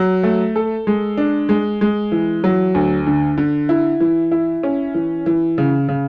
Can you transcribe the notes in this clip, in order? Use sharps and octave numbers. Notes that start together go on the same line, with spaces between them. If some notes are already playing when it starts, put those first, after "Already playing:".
Already playing: F#3
A3
A4
G#3
D4
G#3
G#3
E3
F#3
D2
D3
D3
E4
E3
E4
C#4
E3
E3
C#3
C#3